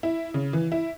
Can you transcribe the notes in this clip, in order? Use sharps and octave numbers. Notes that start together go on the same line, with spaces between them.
E4
C#3
E3
E4